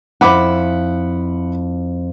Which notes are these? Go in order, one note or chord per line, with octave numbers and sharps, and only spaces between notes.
F2 E4 F#5 B5 D6